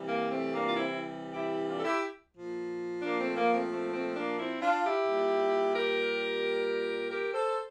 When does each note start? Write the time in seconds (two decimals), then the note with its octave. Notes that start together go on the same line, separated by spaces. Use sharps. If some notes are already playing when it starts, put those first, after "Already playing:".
Already playing: C3 E3 G3
0.08 A#3
0.31 A3 C4
0.53 A#3 D4
0.69 F4
0.76 C4 E4
1.33 E4 G4
1.67 D4 F4
1.79 A4
1.84 E4 G4
2.35 A#2 F3
3.02 A#3 D4
3.20 A3 C4
3.37 A#3
3.54 A3 C4
3.70 A3 C4
3.93 A3 C4
4.15 A#3 D4
4.39 C4 E4
4.61 D4 F4
4.84 E4 G4
5.07 A#2 G3
5.74 G4 A#4
7.11 G4 A#4
7.33 A4 C5